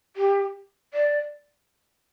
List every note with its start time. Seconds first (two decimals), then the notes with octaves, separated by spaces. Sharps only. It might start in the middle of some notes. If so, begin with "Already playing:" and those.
0.16 G4
0.93 D5